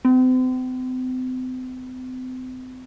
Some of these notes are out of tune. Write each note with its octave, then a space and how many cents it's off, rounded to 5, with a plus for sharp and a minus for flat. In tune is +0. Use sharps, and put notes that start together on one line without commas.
C4 -40